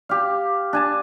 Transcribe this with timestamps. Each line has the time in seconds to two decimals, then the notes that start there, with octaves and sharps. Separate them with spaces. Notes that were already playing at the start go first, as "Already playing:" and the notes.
0.09 G4 F5
0.73 D4 G#5 A5